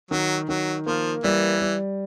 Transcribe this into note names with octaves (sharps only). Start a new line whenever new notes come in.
D#3 F#3
D#3 F#3
F3 A#3
E3 G3
G3